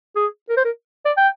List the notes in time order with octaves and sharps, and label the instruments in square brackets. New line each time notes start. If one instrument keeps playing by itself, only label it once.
[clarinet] G#4
A#4
C5
A#4
D5
G5